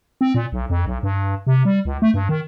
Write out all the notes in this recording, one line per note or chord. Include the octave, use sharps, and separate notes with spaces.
C4
A#2
B1
F2
B1
G2
C3
G3
C#2
A3
G2
D#3